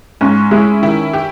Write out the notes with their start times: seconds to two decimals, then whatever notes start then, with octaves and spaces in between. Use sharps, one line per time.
0.21 G#2 C#4
0.51 G#3 E4
0.82 D#3 E4
1.13 G4